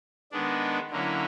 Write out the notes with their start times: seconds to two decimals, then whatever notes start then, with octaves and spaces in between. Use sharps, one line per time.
0.32 D#3 G#3 B3 D4
0.90 D3 F#3 A#3 C#4 E4